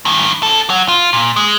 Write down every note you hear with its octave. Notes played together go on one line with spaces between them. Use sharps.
G2 D#3
C#4 A4
F#3 F#4
F4
A#2
G#3